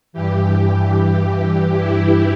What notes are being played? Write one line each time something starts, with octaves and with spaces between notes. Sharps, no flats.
G2 E3 G4
E4